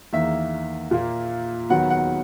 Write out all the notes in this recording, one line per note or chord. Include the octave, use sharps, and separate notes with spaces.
E2 D#3 A#3 E5
A#2 A#3
D#2 D#3 F#3 B3 F#5
F#5